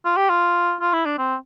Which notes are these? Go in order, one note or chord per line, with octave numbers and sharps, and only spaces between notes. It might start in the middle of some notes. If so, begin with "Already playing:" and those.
F4
G4
F4
F4
E4
D4
C4